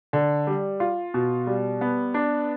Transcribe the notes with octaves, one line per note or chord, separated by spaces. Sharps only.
D3
G3
F4
B2
G3
B3
D4